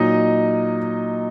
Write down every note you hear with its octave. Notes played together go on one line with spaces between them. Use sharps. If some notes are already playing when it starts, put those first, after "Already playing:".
Already playing: A#2 F#3 D#4 D#5